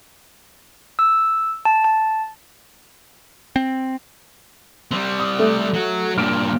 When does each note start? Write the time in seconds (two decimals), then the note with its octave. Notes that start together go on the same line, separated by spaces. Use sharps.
0.99 E6
1.65 A5
1.84 A5
3.56 C4
4.91 G3 C4
5.19 D#6
5.39 A3
5.74 F#3 F#4
6.18 G2 A#2 F6 D7 E7